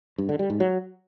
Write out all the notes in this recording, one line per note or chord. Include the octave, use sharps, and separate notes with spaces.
G2
D3
G3
G#2
F#3